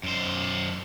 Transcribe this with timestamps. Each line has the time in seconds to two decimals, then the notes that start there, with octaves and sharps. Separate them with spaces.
0.03 F#2 C5